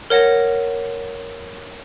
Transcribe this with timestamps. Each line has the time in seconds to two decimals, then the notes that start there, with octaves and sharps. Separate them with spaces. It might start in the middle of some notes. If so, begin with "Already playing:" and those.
0.10 A#4 C#5 F#5 A#6